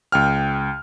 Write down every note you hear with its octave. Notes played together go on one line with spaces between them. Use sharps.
C#2 G5 F6